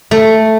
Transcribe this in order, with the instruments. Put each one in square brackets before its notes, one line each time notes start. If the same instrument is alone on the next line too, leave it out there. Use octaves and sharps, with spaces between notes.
[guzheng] A3